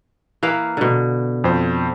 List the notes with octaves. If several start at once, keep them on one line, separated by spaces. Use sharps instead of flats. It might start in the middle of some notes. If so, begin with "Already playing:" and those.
E3 A#3 F5
B2 D3
F2 C5